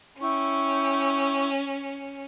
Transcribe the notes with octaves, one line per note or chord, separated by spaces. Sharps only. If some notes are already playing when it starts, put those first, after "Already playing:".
C#4 E4 G5 C#6